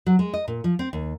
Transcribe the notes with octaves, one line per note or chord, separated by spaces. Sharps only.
F#3
G#3
D#5
A#2
F3
C4
D#2